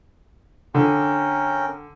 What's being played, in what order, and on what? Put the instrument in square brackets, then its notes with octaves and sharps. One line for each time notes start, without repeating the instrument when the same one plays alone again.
[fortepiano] D3 [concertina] C#4 A#4 G5